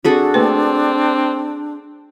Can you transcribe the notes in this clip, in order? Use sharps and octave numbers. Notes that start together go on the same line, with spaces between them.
C4 D4 F#4 G#4 A4
A3 A#3 C4 B4